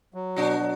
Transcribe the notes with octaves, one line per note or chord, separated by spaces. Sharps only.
F#3
B2 D4 F#4
F#3